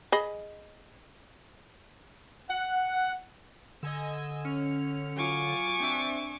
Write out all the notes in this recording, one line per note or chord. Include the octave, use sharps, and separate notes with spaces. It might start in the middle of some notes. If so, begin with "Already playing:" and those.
G#4 D#5 B5
F#5
D3 D#5 G#5 E6
C#4 F6 C#7
F#3 F4 G#5 C#6 D6
C4 D4 E5